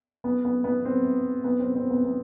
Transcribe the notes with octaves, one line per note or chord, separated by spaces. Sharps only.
B3
B3
B3
C4
B3
C4
C4
B3
B3